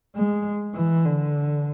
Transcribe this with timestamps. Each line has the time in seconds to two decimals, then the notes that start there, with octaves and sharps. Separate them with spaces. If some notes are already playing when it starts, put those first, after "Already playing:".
0.15 G#3
0.75 E3
1.05 D3